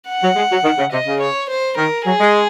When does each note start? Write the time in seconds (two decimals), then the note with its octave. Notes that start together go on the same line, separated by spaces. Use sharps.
0.09 F#5
0.23 F#3
0.36 G#3
0.51 F#3
0.64 D#3
0.78 C#3
0.92 C3 D#5
1.07 C#3
1.21 C#5
1.50 C5
1.77 D#3 A#4
2.06 F#3 G#4
2.20 G#3